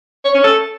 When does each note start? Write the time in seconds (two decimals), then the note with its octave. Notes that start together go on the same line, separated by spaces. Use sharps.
0.25 C#5
0.34 C#4
0.44 A4